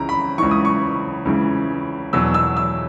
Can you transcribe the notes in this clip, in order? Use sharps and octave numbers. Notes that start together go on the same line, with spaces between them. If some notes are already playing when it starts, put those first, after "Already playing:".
Already playing: C#2 C#3 E3 A#5
B5
C#2 C#3 E3 C#6
D#6
C#6
C#2 C#3 E3
E2 B2 F#3 E6
E6
E6